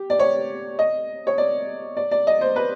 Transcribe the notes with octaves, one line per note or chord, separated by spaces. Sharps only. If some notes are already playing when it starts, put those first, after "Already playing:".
Already playing: G4
D5
C#5
D#5
C#5
D5
D5
D5
D#5
C5
B4